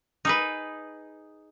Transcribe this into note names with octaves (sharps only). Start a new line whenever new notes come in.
D#4 G#4 B4